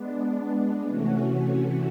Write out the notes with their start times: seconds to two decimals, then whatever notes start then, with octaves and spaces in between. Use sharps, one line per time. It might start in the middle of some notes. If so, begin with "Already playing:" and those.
Already playing: G#3 B3 D4
0.86 C3 E3 A3 C#4 F#4